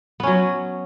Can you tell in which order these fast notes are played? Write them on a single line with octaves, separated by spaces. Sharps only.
B3 C#4 F#3